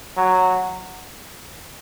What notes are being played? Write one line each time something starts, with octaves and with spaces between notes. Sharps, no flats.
F#3